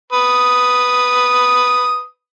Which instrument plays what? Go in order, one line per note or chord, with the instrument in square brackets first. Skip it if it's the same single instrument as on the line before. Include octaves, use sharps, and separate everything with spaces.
[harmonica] B4 D#6